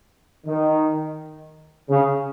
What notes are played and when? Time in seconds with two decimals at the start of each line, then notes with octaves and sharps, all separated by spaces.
0.45 D#3
1.88 C#3